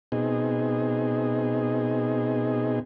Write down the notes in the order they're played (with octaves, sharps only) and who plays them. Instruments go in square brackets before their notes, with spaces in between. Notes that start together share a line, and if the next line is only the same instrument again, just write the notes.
[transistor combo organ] B2 C4 D#4 G#4